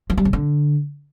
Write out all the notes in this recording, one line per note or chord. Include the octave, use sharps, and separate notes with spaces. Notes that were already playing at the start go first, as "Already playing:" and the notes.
F3
G3
C#3
D3